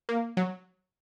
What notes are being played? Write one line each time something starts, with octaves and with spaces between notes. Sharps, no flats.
A#3
F#3